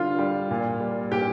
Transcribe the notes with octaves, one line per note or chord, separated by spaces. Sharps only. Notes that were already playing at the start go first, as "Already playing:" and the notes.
Already playing: D3 G3 F4 F5
G3
A#2
G3
A#2 G4 G5